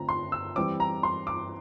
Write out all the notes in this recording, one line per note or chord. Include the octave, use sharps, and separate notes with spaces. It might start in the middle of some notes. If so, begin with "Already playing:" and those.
Already playing: D3 A3 C4 F4 A#5
C6
E6
E3 G3 C4 D6
A#5
C6
D6